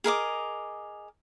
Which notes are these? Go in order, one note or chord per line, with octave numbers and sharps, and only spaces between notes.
G#4 A#4 D#5 D6